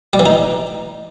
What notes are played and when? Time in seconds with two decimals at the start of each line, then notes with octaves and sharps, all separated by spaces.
0.13 G3
0.20 E3
0.26 D#4